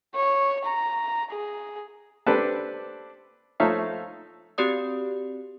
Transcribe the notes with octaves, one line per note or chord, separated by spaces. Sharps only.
C#5
A#5
G#4
C4 D4 G4 A4 B4
F3 A3 D#4 C#5 E5 F5
C4 F#4 G4 D5 D#6